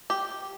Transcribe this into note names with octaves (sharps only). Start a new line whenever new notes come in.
G4